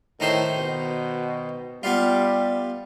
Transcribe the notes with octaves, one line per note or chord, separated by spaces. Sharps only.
A2 D#3 D#4 C5
B2
G3 B3 F4